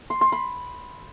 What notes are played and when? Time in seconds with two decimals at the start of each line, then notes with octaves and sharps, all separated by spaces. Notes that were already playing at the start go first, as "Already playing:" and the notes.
0.10 C6
0.21 C6
0.32 B5